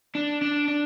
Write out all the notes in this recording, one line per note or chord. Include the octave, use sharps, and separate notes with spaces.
D4
D4
D4